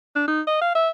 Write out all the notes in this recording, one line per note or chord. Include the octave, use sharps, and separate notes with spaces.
D4
D#4
D#5
F5
E5